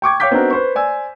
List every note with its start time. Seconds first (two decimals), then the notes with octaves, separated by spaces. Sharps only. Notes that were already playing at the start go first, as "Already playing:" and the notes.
0.02 G5 C#6 D6 G#6
0.20 C#5 F5 G5 D6 G6 B6
0.31 B3 C4 D4 D#4 F#4 A#4
0.51 B4 C5 C#6
0.75 C5 D5 G#5 E6